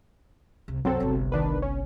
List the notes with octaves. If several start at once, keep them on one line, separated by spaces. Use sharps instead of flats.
C2
C2 F#2 F#3 C4 A4
G1 C2
D#3 D4 B4
C#4